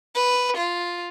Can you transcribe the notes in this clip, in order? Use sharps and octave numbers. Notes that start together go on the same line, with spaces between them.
B4
F4